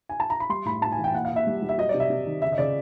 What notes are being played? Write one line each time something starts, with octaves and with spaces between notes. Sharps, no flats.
G#5
A5
A#5
B5
G3 C6
A2 B5
A2 A5
G#5
E3
G5
A#2 F#5
F5
A#2
E5
G3
G3
E5
F#3 D#5
D5
C3
E5
C3
D#3
C#3 E5
D#5
C#3 D5